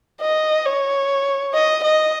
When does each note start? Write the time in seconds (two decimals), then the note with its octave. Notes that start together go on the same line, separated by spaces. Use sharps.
0.21 D#5
0.66 C#5
1.54 D#5
1.84 D#5